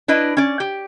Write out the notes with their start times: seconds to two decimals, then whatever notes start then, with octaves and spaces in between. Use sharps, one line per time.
0.08 D4 E4 B4 D#5
0.37 C#4 D5
0.60 G4